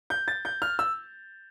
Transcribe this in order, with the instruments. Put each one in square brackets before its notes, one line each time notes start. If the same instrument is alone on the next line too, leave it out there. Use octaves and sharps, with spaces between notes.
[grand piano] G6
A6
G6
F6
E6